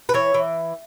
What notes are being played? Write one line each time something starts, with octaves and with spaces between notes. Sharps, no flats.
B4
E3 C#5
E3